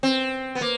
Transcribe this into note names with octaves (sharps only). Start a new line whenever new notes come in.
C4
B3
A#3